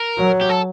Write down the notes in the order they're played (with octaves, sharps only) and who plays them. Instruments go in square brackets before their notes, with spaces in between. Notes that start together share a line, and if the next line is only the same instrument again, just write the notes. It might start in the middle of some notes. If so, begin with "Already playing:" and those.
Already playing: [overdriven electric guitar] A#4
[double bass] F#3
[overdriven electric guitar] G4
A4